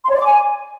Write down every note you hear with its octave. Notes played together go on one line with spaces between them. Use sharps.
C6
C#5
D5
D6
G#5